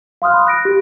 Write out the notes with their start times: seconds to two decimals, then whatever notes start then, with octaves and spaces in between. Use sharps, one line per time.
0.22 F5 C6 D#6 F6 F#6
0.34 B5
0.47 F#6 A#6 D7
0.65 G4